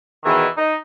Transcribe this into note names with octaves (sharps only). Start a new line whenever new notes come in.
E2 B2 D#3 E3
D#4